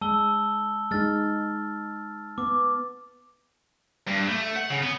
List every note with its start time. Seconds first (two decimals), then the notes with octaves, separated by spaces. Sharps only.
0.01 G#3 A5 E6 G7
0.91 G#3 D#4 F6 A6
2.38 B3 D6
4.07 G2
4.28 A3
4.57 F#5
4.70 C#3
4.82 B3